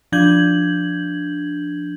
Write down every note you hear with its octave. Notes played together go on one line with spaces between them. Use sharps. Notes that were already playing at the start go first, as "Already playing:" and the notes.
F3 D4 G6 G#6 F#7